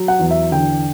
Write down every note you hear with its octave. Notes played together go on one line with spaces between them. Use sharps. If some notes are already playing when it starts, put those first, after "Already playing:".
Already playing: F#3
F#5
E2
E5
D3 G5